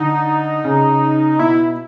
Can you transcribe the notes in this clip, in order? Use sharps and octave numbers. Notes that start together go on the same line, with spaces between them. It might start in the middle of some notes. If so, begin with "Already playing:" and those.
Already playing: D3 D#4
C#3
B2 E4